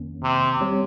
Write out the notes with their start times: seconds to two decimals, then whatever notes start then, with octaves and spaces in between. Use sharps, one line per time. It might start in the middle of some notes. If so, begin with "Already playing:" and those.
Already playing: F2 D#3 A#3 C#4
0.23 C3
0.61 G3 C4 G4 C#5